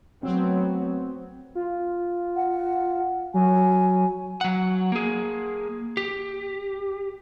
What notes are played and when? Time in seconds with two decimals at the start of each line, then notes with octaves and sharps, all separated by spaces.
0.23 F#3 A3 B3 C4
1.55 F4
2.36 F#5
3.34 F#3 G#5
4.41 F#3 F#5
4.92 A#3 G#4
5.97 G4